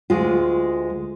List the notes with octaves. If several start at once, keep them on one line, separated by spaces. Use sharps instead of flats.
D2 G#3 F4